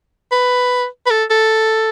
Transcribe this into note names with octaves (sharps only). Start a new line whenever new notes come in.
B4
B4
A4
A4